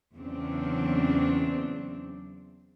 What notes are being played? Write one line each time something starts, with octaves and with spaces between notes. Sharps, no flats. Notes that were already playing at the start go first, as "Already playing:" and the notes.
E2 C#3 F#3 C4 D4